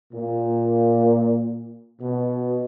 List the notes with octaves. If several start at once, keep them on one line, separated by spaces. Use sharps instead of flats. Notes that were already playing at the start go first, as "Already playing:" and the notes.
A#2
B2